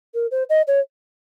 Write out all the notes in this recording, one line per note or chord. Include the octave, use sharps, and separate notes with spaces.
A#4
C5
D#5
C#5